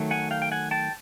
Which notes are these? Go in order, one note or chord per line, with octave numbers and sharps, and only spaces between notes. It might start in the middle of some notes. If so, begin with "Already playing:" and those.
Already playing: D#3 F#3 A3
F#5 G#5
F5 G5
G5
F#5 G#5
G5 A5